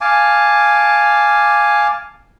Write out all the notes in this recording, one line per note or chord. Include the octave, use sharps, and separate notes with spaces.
F5 G#5 A5 D6